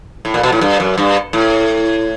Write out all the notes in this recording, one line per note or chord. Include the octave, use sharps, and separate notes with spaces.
A2
A#2
B2
A2
G2
F#2
G2
A2